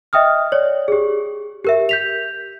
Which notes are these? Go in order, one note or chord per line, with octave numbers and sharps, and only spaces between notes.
D#5 E5 G5 D#6 F6
C#5 D5
G4 G#4
G4 A#4 E5
G6 B6 F7